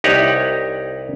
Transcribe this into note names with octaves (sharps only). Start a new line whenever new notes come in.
C2 D#4 G4 C#5 F#5